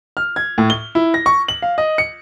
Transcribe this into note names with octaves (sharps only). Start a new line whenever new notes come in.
F6
G#6
A2
G7
E4
A#6
C#6
F#7
F5
D#5
C#7